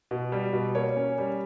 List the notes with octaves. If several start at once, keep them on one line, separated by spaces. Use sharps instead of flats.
B2
G3
B2
A#3 C#5
C#4
G3